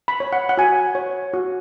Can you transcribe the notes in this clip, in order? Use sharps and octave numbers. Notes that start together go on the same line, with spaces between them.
B5
C#5
F#5
F#5
F#4 G#5
C#5
F#4